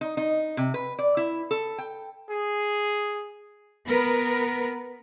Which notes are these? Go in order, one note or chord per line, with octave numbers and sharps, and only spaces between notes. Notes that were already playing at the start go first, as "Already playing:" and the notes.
D#4
D#4
C3
B4
D5
E4
A4
G5
G#4
B3 A#4 B4